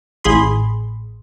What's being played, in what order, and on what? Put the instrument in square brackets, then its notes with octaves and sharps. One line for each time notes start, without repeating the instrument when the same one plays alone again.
[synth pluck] A1 G#4 B5 C6